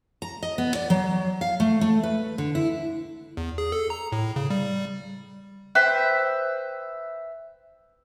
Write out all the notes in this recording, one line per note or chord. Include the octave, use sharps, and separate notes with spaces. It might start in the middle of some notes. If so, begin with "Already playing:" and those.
A#5
D#5
B3
D5
F#3
F5
A3
A3
B4
D3
E4
E2
G#4
A4
A#5
A2
C#3
G3
B4 C5 E5 G5